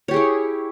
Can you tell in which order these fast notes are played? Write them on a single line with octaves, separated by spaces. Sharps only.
C#5 G4 G#4 E4